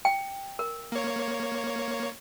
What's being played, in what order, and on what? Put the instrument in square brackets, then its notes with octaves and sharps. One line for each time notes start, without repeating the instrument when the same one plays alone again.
[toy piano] G5
A#4
[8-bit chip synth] A#3 C#5